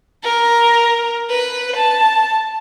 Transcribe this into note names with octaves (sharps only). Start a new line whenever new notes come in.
A#4
B4
A5